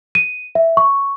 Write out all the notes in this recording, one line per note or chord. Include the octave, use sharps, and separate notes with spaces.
D#7
E5
C#6